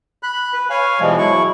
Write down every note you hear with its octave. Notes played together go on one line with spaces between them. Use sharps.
B5 F#6
B4
C#5 F5 G#5
B2 E3 F3 G3 G#3
F#3 E4 C#6